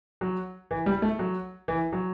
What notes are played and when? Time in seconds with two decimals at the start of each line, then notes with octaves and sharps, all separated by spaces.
0.21 F#3
0.71 E3
0.86 G3
1.02 A3
1.19 F#3
1.68 E3
1.92 F#3